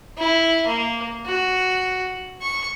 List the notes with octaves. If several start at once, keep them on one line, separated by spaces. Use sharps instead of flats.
E4
A#3
F#4
C#6